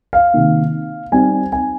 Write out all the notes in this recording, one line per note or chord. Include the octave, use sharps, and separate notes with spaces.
F5
C3 D#3 A#3
G3 C4 D#4 G#5
G#5